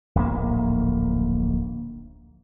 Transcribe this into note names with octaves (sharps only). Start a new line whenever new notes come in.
D1 A#1 G#2 A#3